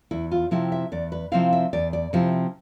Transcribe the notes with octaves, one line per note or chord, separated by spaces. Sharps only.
E2 E4
F4
C3 F3 C4 E4 G4
E5
E2 D5
B4
C3 F3 C4 E4 F5
E5
E2 D5
D5
C3 F3 C4 E4 C5